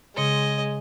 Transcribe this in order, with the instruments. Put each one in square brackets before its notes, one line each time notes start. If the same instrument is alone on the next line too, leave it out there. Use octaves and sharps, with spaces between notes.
[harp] C#3 C6 C#7 [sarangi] G#3 [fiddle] D#5